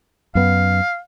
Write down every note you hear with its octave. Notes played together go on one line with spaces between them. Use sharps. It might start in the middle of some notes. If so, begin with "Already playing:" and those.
F#2 B3 F5